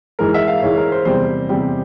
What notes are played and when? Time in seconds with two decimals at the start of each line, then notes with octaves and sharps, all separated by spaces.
0.19 G#2 E3 G#3 A#4
0.34 E5
0.48 F5
0.62 G#2 E3 G#3 C#5
0.77 A#4
0.92 C5
1.05 E2 C3 G3 C5
1.49 E2 C3 G3 G4